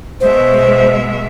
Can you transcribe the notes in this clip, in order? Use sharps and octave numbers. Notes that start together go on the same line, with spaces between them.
B2 G#3 C5 E5